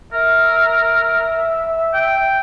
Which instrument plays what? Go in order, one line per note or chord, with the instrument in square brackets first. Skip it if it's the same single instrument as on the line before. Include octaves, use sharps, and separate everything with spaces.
[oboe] A#4 [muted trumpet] E5
[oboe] G5